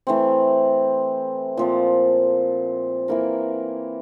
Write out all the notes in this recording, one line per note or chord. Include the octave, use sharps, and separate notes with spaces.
E3 A3 C4
A#2 F3 C4
E3 A#3 E4 A#4